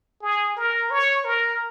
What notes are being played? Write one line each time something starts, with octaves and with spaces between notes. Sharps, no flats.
G#4
A#4
C#5
A#4